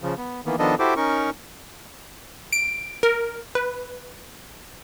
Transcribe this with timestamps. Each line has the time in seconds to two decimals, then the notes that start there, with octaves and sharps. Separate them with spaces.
0.02 C#3 F3
0.18 B3
0.46 D#3 E3 A#3 B3
0.59 D#3 F3 B3 D4 A4 D#5
0.79 E4 F#4 G4 A4 C5 D6
0.97 C#4 D#4 A#4 C#6
2.53 D7
3.03 A#4
3.55 B4